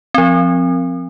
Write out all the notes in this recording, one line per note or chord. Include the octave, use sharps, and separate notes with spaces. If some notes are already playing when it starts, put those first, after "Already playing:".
F3 C4